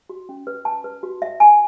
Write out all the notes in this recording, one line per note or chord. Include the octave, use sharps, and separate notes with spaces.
F#4
C#4
B4
A5
B4
F#4
E5
G#5